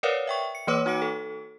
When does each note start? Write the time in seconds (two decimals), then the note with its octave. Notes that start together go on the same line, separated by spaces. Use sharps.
0.03 A#4 B4 C#5 D5 F5 F#5
0.27 E5 G5 C#6
0.55 C#7
0.67 E3 A#3 B4 C#5 D6 E6
0.86 D#4 F#4 F#5 D6 C#7 D7
1.02 A4